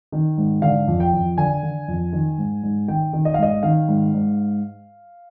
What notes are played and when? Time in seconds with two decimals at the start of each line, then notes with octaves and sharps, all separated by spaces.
0.12 D#3
0.38 G#2
0.62 D3 F5
0.88 F2
1.00 G5
1.13 F2
1.37 D3 G#5
1.63 D3
1.88 F2
2.13 D#3
2.38 G#2
2.63 G#2
2.88 D#3 G5
3.13 D#3
3.25 D#5
3.34 F5
3.38 G#2 D#5
3.63 D#3 F5
3.88 G#2
4.14 G#2